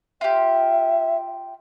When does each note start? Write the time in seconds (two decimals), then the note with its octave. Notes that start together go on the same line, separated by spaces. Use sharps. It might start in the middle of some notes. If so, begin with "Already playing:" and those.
0.21 F4 G4 E5